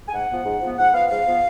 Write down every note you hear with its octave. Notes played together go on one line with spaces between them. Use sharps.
G#5
G#2 F#5
F3 B3
G#2
F3 B3
G#2 F#5
F3 B3 F5
G#2 F5
F3 B3